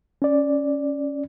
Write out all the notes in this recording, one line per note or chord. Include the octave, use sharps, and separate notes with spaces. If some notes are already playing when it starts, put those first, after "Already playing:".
C#4 D5